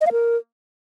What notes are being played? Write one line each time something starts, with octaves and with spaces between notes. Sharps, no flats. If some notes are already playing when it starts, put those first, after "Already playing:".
D#5
F5
A#4